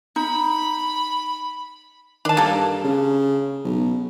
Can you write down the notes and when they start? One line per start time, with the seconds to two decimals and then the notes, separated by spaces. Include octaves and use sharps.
0.16 D#4 B5
2.25 D#3 D4 A5
2.37 G2 A#3 A4
2.84 C#3
3.65 B1